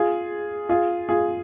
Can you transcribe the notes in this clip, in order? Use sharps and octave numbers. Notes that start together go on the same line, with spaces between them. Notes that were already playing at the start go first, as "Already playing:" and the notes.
Already playing: F4 G#4
F4 G#4
F4 G#4